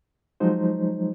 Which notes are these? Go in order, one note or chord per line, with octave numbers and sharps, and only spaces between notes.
F3 F#3 G#3 D#4 C5